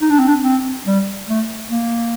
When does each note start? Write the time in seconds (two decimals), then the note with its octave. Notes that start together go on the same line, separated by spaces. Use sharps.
0.01 D#4
0.10 D4
0.19 C4
0.28 D4
0.44 C4
0.86 G3
1.28 A3
1.70 A#3